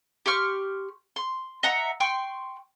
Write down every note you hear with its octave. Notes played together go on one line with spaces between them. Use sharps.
G4 C6 C#6 F6
C6
D#5 E5 F#5 A#5
G5 C6 C#6